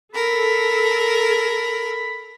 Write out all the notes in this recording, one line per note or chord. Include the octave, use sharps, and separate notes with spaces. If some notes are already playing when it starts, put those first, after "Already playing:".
A4 A#4 B5